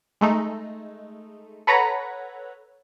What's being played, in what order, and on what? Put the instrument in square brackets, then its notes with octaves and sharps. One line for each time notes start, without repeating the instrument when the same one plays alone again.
[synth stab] G#3 A3 D#4
A4 B4 C#5 F#5 A#5 B5